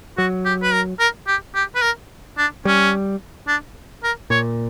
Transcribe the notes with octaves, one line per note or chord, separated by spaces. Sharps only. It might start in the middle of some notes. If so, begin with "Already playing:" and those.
F#3 F#4
G4
B4
A#4
A#4
G4
G4
B4
A#4
D4
G3 C#4
D4
A#4
A#2 C#5